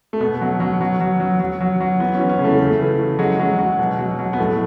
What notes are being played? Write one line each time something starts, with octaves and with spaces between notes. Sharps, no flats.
A3
B2 B3
F#3
F#3
F#3
F#3
F#3
F#3
F#3
F#3
E3 B3
C#4
E3
C#4
C#3
A3
C#3 A3
E3
E3
F#3 G#3
F#3
F#3
B2
F#3
F#3
B3
A2 A3